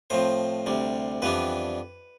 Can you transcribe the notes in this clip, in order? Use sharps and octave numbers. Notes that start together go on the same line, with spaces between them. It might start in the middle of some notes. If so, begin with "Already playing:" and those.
A2 F3 C4 C5
D2 C3 G3
F2 E3 G3 B3 D4 B4